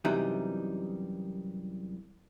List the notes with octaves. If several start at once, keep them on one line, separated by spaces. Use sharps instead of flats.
F#2 C3 E3 G3 D#4